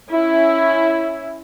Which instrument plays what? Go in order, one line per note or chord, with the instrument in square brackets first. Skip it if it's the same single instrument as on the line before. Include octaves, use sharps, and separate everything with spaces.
[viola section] C#4 E4